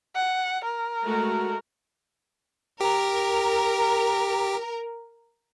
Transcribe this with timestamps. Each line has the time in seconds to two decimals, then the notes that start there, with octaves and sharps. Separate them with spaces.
0.15 F#5
0.64 A#4
1.03 G#3 A3 F#4
2.81 G4 A#4